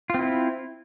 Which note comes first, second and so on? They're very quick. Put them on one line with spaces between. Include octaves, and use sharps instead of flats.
F4 C4 E4